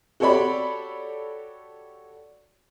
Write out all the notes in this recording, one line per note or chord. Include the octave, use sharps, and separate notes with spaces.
F#4 G4 A4 C#5 D5 B5